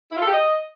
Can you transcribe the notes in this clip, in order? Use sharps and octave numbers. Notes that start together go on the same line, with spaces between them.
E4
F4
A4
G4
D#5